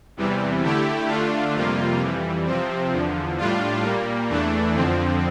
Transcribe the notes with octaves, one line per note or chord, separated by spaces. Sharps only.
E2 C3 E3 G3
D3 A3 E4 G4
D3 A3 D4 F4
F2 C3 G3 A#3 F4
F2 E3 G3
C3 F3 C4
E2 D3 F3
A2 G3 D4 F4
A#2 G3 A#3
E2 E3 A3 D4
F2 D3 F3 C4